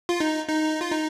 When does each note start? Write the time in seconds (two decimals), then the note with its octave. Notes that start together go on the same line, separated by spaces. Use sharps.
0.09 F4
0.20 D#4
0.49 D#4
0.81 F4
0.91 D#4